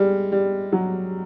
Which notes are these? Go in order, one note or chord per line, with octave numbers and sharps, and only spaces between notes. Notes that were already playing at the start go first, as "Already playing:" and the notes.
Already playing: G3 G#3
G3
F#3